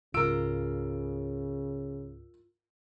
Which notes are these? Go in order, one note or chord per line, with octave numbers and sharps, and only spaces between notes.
C#2 G#2 C#3 F4 A#4 E6 D7